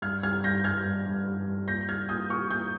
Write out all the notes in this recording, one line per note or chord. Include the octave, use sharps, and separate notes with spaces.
G2 F6 G#6
G3 F6 G#6
G2 G6 A#6
G2 F6 G#6
G2
G2
G2
G3
A#2 G6 A#6
G3 F6 G#6
A#2 D#6 G6
A#2 C#6 F6
A#2 D#6 G6